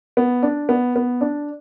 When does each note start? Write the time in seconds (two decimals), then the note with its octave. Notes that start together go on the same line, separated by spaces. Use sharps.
0.17 B3
0.43 D4
0.69 B3
0.96 B3
1.21 D4